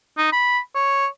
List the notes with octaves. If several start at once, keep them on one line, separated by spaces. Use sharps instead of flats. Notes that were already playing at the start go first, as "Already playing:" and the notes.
D#4
B5
C#5